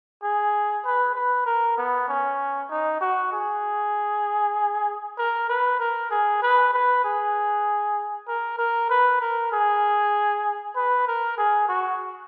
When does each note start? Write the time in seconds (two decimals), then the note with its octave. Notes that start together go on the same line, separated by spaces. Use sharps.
0.23 G#4
0.85 B4
1.15 B4
1.46 A#4
1.78 B3
2.09 C#4
2.70 D#4
3.01 F#4
3.32 G#4
5.18 A#4
5.49 B4
5.80 A#4
6.11 G#4
6.42 B4
6.74 B4
7.04 G#4
8.28 A#4
8.59 A#4
8.90 B4
9.21 A#4
9.52 G#4
10.76 B4
11.07 A#4
11.38 G#4
11.69 F#4